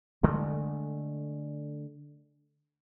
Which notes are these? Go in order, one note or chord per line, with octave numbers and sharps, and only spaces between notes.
D3 G#3 A3